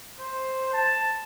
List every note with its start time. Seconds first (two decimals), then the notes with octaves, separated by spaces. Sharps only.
0.19 C5
0.73 A5